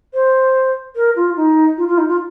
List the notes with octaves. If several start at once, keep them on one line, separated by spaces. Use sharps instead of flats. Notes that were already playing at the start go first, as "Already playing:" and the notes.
C5
A#4
F4
D#4
F4
F4
D#4
F4